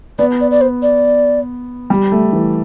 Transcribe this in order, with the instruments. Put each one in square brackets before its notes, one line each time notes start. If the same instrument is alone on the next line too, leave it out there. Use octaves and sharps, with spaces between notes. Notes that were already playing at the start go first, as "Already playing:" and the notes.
[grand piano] B3 [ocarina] D5
[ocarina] D5
D5
C5
D5
[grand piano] G3
A3
E3